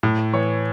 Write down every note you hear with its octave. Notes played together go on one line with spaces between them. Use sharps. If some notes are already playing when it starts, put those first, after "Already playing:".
A2
E3 C#5